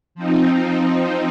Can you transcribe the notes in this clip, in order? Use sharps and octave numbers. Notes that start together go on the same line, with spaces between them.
F3 C4 D#4